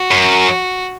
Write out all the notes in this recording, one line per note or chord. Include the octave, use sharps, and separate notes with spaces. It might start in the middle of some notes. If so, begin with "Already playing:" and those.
Already playing: F#4
F#2